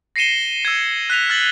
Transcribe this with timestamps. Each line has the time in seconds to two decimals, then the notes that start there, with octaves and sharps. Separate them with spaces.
0.16 A#6 C7 C#7 D#7 E7 G7
0.65 E6 G#6
1.10 F#6 B6 F7
1.29 F6 A6 F#7 G7